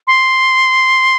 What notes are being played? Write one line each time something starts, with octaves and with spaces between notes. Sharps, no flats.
C6